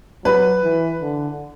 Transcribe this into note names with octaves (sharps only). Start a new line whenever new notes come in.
F#3 B4
E3
D3